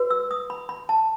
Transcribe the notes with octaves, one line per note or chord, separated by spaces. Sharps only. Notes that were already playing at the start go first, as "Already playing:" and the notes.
Already playing: F#4 B4
E6
D#6
B5
B5
A5